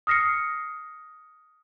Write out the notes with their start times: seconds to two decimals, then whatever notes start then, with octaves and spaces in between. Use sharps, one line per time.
0.07 D#6 F6 A#6 C7 C#7